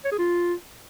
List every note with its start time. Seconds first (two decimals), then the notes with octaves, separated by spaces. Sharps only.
0.05 C#5
0.12 G#4
0.19 F4